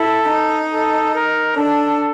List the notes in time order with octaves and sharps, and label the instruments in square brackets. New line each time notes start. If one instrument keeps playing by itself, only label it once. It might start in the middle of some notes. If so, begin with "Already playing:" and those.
Already playing: [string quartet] E4 [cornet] A4
[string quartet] D#4
[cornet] A4
A#4
[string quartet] D4 [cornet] A4